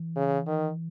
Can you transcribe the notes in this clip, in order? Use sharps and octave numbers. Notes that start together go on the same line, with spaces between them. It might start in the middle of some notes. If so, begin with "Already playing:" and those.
Already playing: E3
C#3
D#3